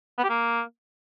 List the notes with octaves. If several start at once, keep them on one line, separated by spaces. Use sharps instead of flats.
B3
G4
A#3